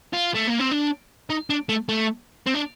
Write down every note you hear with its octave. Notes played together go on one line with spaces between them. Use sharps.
F4
A3
A#3
C4
D4
D#4
D4
A3
A3
C4
D4